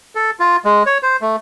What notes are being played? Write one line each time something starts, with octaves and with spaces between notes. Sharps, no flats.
A4
F4
G#3
C#5
C5
A3